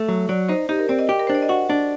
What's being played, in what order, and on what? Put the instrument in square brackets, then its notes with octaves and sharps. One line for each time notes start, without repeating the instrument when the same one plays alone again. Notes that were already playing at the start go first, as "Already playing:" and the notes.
Already playing: [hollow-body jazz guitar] A3
F#3
[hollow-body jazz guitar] F#3 [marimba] D5
[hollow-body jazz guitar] D#4 [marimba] C5
[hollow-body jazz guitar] D#4 [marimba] G4
[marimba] A#4
[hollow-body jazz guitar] C4 [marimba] D5
[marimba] D#5
[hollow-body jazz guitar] G4 [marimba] G5
[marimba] A#4
[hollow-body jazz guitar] D4 [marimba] C5
[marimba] D5
D#5
[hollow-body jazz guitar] F#4 [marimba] F#5
[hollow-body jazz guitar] D4